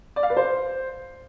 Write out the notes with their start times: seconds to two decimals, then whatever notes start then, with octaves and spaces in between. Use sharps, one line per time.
0.16 D5
0.23 F5
0.30 B4
0.37 C5